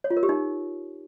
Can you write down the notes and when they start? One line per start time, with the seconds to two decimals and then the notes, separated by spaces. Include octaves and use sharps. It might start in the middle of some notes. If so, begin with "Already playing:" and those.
0.04 C#5
0.10 F4
0.17 A#4
0.23 G4
0.29 D#4